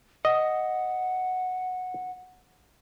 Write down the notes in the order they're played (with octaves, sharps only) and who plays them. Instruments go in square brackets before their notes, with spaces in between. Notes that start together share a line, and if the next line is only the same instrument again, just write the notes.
[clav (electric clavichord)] D#5 [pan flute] F#5